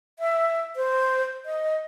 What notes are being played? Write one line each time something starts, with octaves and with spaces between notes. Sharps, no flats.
E5
C5
D#5